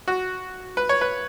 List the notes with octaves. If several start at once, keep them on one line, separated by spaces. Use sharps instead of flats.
F#4
B4
C#5
B4